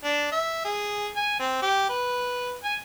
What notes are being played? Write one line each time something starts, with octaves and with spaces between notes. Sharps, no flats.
D4
E5
G#4
G#5
C4
G4
B4
G#5